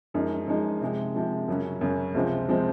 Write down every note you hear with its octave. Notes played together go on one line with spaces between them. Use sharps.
F#2 F3 G#3 D#4
F#2 F3 G#3 D#4
C3 F3 G#3
C3 F3 G#3
F#2 C#3 F#3 C#4
F#2 C#3 F#3 C#4
C#2 C3 F3 G#3 C4
C3 F3 G#3 C4